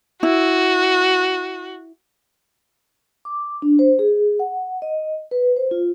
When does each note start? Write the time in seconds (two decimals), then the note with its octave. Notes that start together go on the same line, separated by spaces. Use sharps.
0.23 E4 F#4
3.25 D6
3.62 D4
3.79 C5
3.99 G#4
4.40 F#5
4.82 D#5
5.31 B4
5.56 C5
5.71 F4